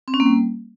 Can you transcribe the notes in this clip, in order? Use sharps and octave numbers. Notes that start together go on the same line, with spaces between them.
C4
C#4
A#3
G3